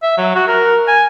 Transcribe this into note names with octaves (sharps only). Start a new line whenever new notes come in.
E5
F#3
F#4
A#4
G#5